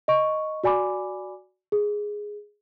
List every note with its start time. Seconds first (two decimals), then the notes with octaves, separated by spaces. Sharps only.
0.08 D#5 C#6
0.64 F#4 D5 G#5 B5 D6
1.72 G#4